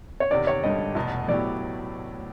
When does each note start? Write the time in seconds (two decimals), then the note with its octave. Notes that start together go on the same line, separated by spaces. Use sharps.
0.20 C#5
0.31 E2 C3 D#3 D5
0.47 C#5
0.63 G#1 G2 D3 G3 D#5
0.95 F1 E2 B2
1.28 A2 F#3 B3 E4 G4 D5